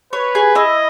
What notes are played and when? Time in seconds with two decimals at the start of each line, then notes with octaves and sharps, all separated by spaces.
0.13 B4 C#5
0.35 G#4
0.55 E4 D#5